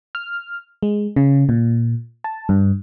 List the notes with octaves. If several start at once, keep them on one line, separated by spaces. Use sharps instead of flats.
F6
G#3
C#3
A#2
A5
G2